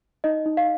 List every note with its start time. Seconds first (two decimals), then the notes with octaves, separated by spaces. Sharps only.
0.24 D#4 D#5
0.46 D#4
0.57 F5